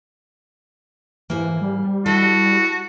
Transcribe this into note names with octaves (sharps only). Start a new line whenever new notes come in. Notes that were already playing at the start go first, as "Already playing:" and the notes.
G#2 E3 A#3
G3
E4 F#4 A4 D#5